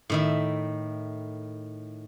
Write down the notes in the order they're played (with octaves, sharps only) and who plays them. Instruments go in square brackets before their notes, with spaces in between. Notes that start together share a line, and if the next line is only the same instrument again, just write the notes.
[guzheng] A2 D#3 E5